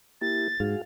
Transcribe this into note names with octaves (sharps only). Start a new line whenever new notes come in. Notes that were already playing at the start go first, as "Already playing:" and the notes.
A#3 E4 G4 A6
G#2 F#4 G#4 F5